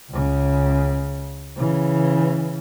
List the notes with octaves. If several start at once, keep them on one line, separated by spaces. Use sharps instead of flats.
C#2 C#3
C#3 E3